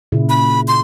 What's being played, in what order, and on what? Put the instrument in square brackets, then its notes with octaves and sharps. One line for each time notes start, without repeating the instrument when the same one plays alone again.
[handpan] A#2 C#3 E4
[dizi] B5
C6